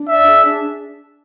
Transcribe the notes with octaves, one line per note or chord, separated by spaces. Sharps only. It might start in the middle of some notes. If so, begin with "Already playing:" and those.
Already playing: D4
D5 E5
G#4
D4